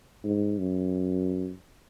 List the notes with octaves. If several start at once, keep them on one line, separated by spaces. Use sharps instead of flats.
G#2
F#2